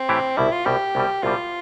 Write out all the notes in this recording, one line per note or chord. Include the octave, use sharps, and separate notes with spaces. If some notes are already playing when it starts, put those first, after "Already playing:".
Already playing: C4
A2 E3 A3 E4 G4
C2 B2 G3 E4
F4
C2 B2 G3 G4
C2 B2 G3
C2 B2 G3 F4